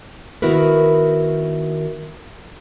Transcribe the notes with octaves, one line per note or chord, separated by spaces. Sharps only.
D#3 B3 E4 F#4 A#4 B4